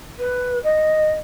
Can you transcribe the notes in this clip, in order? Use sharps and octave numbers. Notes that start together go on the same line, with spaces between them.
B4
D#5